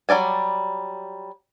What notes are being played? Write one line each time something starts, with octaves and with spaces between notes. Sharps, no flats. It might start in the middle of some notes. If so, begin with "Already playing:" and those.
F#3 G3 D5 G#5